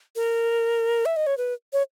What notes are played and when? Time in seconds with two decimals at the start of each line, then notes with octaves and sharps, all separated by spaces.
0.16 A#4
1.06 E5
1.16 D#5
1.27 C#5
1.38 B4
1.73 C#5